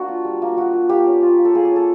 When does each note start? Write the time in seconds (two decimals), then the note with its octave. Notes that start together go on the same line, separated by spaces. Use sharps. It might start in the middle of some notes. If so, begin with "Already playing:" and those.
Already playing: A#3 D4 F#4
0.08 F4
0.25 G3
0.42 A#3
0.57 F4 F#4
0.73 A#3
0.89 A#3 G4
1.06 C#4
1.22 F4
1.39 A#3
1.45 A4
1.55 A#3 G#4
1.65 G#4
1.71 C#4
1.76 A4